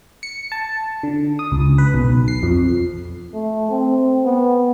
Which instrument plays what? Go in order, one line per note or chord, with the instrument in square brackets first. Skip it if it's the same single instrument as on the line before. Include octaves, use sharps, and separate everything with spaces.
[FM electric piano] C#7
A5
D3
D#6
C#2
B4
B1
C7
F2
[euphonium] A3
C4
B3